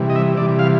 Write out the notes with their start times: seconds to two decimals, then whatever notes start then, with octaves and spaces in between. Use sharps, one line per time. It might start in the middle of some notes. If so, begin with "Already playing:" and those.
Already playing: C3 E3 G3
0.10 D#5
0.15 E5
0.37 C3 E3 G3 D5
0.59 F5